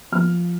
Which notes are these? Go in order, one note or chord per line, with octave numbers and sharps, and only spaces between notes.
F3 F6